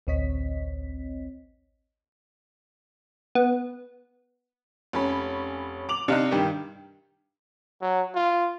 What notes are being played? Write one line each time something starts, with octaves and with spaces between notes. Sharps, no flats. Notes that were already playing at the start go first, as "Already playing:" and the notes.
A1 D2 C4 C#5 D#5 B6
B3
F1 C#4 B5
D6 F7 F#7
C3 D4 D#4 F5 F#6
G2 D#3 G4
F#3
F4